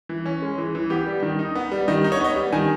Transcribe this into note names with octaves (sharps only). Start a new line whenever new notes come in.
E3
C#4
G#3
E3
E3
B3 G4
G3
D#3
D#4
B3
G3
D#3 D#5
D#4
C#5
B3 D#5
G3
D#3 G#5